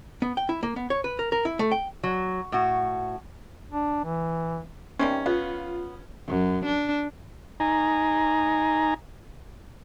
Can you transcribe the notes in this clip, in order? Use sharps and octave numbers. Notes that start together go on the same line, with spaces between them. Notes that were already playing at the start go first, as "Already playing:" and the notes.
B3
G5
E4
A#3
B3
C#5
B4
A#4
A#4
E4
A3
G5
F#3
A2 F#4
D4
E3
C3 D#3 G3 C#4
B3 F4
F#2
D4
D#4 G#5 A#5